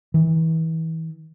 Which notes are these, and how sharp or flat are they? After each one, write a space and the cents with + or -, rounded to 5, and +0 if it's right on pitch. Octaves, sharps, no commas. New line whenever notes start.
E3 -35